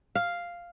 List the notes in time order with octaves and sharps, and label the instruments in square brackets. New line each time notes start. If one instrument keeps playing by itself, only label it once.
[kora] F5